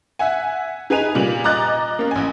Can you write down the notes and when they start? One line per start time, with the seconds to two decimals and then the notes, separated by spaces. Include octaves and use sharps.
0.19 E5 F#5 G#5
0.90 D#4 G#4 B4 G#5 D#7 F7
1.15 A#2 G3 F#7
1.44 D#5 A#5 D6 F#6 A6
1.99 A#3 C#4
2.11 A1 G#5